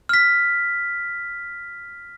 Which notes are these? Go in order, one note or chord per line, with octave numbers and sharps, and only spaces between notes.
F6 B6